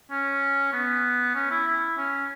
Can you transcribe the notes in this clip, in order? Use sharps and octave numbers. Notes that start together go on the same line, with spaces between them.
C#4
B3
C#4
E4
E4
C#4